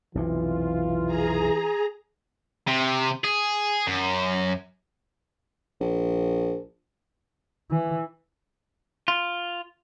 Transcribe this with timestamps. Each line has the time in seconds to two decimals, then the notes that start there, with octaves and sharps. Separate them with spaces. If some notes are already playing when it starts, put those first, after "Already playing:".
0.15 B1 F2 C3 E3 F4
1.06 G#4 A#5
2.68 C3
3.24 G#4
3.87 F#2
5.81 A#1
7.71 E3
9.08 F4